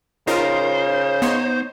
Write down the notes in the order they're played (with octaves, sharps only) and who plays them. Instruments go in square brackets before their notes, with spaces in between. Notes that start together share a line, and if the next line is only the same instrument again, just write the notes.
[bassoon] C#3 [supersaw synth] D#4 F4 A#4 [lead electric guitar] C5
[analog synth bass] B3 [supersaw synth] D#4 C#5 C6